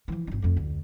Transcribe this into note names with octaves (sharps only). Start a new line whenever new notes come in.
E3 F3
G#1 D#4
F2 A3
D2